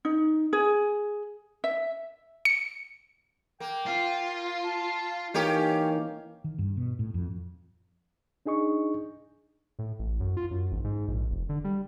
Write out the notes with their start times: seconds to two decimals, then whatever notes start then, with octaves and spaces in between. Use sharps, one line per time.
0.05 D#4
0.53 G#4
1.64 E5
2.45 C#7
3.60 A#3 G5
3.86 F4
4.64 A5
5.34 E3 A#3 C#4 D#4 G4 A#4 F5
6.44 D#3
6.59 G2
6.77 B2
6.99 A2
7.14 F2
8.46 D4 D#4 G#4 D#5 C#6
9.79 A2
9.99 A1
10.20 F#2
10.37 F4
10.51 F#2
10.72 G#1
10.84 G#2
11.08 A#1
11.31 F1
11.49 D3
11.64 G3